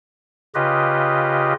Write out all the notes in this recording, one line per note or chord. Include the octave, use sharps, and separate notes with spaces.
C#3 F4 G4 B4 D#5